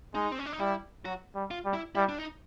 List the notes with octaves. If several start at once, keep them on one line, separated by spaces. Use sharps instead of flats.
G#3 D#4
C4
C#4
D4
D#4
G3 E4
F#3 F#4
G3
F4
G3
E4
G3 E4
D4
D#4